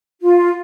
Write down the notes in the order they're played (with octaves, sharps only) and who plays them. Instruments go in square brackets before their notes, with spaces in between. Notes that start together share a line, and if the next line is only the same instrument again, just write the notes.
[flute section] F4